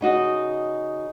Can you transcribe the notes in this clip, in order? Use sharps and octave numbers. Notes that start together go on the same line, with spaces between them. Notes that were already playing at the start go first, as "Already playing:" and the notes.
C#3 D#4 F#4 D#5